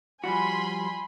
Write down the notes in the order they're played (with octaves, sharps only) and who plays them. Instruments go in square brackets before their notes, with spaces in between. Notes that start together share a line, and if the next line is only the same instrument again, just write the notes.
[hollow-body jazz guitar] F3 G3 F#4 [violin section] G#5 B5 C6